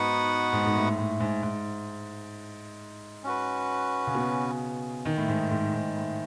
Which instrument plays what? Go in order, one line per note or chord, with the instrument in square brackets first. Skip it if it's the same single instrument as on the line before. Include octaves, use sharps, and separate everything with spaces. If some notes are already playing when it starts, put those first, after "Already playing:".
Already playing: [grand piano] G#2 [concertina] B3 D#4 F#4 B4 F#5
[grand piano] G#2
G#2
A2
A2
G#2
G#2
[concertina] C#4 F#4 B4
[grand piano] C#3
B2
D#3
A2
G#2
G#2
G#2
A2